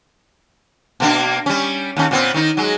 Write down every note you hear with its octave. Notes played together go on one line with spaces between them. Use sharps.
B2 A#3 D4
G3 C#4
D#2 C#4
A#2 B3 C4
D#3 D#4
F#3 G#3